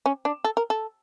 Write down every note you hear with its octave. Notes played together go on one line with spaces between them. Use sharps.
C#4
D4
A4
A#4
A4